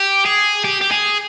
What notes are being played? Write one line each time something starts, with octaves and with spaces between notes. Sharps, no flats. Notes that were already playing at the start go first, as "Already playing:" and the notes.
Already playing: G4
G#4
G4
G4
G#4